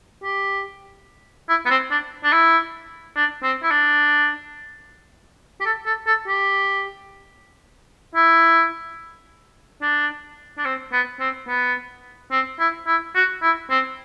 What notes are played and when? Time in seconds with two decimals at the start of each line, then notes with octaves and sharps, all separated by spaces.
0.24 G4
1.49 E4
1.66 B3
1.70 C4
1.91 D4
2.24 D4
2.33 E4
3.16 D4
3.43 C4
3.63 E4
3.71 D4
5.61 G4
5.66 A4
5.86 A4
6.07 A4
6.28 G4
8.15 E4
9.82 D4
10.58 D4
10.65 C4
10.93 B3
11.20 C4
11.48 B3
12.32 C4
12.60 E4
12.87 E4
13.15 F#4
13.43 E4
13.71 C4